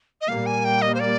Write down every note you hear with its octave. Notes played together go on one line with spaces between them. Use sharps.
D#5
A#2 G3 A#3 F5
G#5
G5
D#5
C5
D5